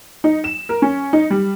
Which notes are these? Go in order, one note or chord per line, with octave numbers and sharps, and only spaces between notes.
D#4
E7
A#4
C#4
D#4
G3